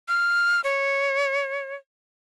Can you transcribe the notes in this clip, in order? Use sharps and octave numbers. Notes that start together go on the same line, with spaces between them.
F6
C#5